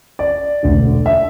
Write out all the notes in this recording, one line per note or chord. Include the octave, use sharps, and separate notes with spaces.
D5
E1 D2 D3
E5